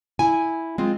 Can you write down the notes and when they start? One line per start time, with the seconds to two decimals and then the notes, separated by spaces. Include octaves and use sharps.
0.19 E4 G#5
0.78 G#3 C4 F4